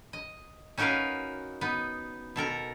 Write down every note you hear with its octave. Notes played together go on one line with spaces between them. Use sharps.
D#5
C#4 D#4 F#4 A#4 B4 F5
B3 D#4
B2 A4 A#4 A#5